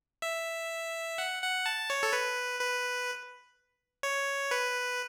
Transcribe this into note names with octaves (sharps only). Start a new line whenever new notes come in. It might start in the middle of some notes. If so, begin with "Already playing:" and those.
E5
F#5
F#5
A5
C#5
A4
B4
B4
C#5
B4